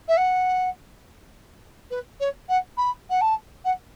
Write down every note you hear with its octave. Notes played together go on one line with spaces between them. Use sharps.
E5
F#5
B4
C#5
F#5
B5
F#5
A5
F#5